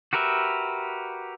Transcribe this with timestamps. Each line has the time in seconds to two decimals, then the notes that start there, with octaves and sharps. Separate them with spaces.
0.13 F#4 G4 A#4 B4 E5